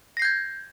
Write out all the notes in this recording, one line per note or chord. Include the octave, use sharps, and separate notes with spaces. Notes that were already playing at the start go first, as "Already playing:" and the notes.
G6 G#6 A#6 C7